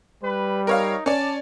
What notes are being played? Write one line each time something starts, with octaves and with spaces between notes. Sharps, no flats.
G3 B4
D#4 A#4 C#5 F5
C#4 D5 A5